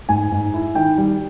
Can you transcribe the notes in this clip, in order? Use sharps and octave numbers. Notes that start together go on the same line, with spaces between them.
G#2 G#5
G#2
E4
D#3 G5
G3